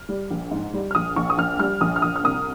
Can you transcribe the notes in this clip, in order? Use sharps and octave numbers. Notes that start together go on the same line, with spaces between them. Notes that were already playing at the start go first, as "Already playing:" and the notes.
Already playing: F6
G3
A#1
G#2
G3
F6
A#1 D#6
A#1 C#6
D#6
A#1 F6
G3 F6
A#1 D#6
F6
A#1 D#6
F6
C2 D#6